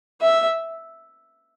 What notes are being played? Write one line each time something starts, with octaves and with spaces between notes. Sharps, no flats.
E5